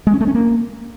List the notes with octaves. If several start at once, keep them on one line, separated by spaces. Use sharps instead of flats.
G#3
C#4
A3
C#4
A#3